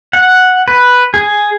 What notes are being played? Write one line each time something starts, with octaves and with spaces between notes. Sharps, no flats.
F#5
B4
G#4